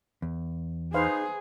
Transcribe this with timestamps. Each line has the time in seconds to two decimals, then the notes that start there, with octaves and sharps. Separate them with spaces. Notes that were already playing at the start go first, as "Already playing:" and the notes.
0.22 E2
0.94 D#4 G#4 B4 C5 F5